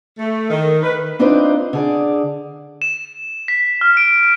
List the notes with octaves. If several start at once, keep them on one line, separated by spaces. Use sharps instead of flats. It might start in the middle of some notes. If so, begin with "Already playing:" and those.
A3
D#3
B4
C4 D4 D#4 F4 B4 C5
D3 G#4 D5
E7
B6
F6
D7